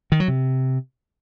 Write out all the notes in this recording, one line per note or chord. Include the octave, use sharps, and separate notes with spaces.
D#3
F#3
C3